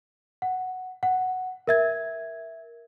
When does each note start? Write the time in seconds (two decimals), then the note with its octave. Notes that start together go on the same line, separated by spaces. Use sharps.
0.42 F#5
1.03 F#5
1.68 A#4 E5 G#6